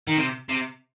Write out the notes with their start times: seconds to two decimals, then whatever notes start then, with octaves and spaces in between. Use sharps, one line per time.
0.07 D#3
0.17 C3
0.49 C3